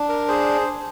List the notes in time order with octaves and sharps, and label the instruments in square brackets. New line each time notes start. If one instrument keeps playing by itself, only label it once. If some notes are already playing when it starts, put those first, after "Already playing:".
Already playing: [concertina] D4
A#4
G#4 C5